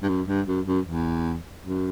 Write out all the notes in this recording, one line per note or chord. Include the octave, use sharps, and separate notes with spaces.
G2
F#2
G2
F#2
F#2
E2
F#2